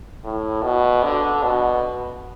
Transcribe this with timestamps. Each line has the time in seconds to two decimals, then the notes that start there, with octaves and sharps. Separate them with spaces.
0.24 A2
0.64 B2
1.03 D3
1.43 B2